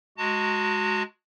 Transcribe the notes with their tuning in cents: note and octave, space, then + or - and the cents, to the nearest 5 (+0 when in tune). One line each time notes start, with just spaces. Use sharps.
G#3 +10 F#4 +0 A5 +40